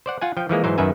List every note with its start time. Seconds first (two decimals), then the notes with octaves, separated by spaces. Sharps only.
0.06 C5 D5 F#5
0.21 F4 F#5 G#5
0.37 F3 G5
0.49 E3 F3 G#3 A#3
0.64 G#2 E3 F#3 D#4 C5
0.78 F#2 D#3 B4 E5 G#5